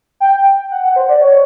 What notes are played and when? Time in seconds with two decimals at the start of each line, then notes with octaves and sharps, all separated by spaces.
0.20 G5
0.71 F#5
0.83 F#5
0.96 C5
1.09 D5
1.21 C#5